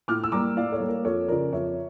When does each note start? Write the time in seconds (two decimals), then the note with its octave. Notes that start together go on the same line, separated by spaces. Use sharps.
0.08 A2 D6 F6
0.24 E6
0.32 G3 A#3 A#5 D6
0.56 A2 D5 F5
0.72 A4 C#5
0.80 G3 A#3
0.88 A#4
1.04 F2 A4 C#5
1.28 C#3 F3 A#4 D5
1.52 F2 C#5 E5